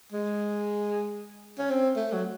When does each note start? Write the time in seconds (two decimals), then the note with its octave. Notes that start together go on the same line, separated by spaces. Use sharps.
0.12 G#3
1.59 C#4
1.70 C4
1.96 A3
2.12 F#3